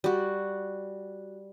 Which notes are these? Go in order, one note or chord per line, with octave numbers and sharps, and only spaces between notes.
G3 F#4